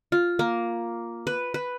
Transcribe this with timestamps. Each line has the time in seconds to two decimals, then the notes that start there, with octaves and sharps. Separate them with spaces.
0.12 F4
0.39 A#3
1.27 B4
1.54 B4